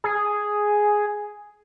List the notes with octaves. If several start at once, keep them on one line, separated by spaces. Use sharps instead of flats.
G#4